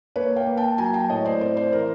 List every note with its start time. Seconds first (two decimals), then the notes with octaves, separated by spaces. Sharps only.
0.16 A#3 B4 C#5
0.36 F5 G5
0.47 A#3
0.57 G5 A5
0.78 F#3 G#5 A#5
0.94 G5 A5
1.10 A2 C#5 D#5
1.25 C5 D5
1.41 C4 C5 D5
1.57 C5 D5
1.72 E3 A#4 C5